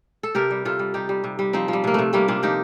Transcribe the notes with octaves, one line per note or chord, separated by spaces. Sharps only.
A4
C3 G4 A#4
G3
C3 F4 A4
G3
G3 D#4 G4
G3
C3
G3
F3 C4 D#4
F3 G3
C3 A#3
C3 A3
C3 G3 A#3
C3 D4 F4
F3 D#4 G4